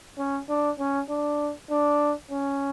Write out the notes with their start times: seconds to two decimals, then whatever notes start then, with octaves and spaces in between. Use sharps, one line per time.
0.18 C#4
0.49 D4
0.79 C#4
1.09 D4
1.70 D4
2.31 C#4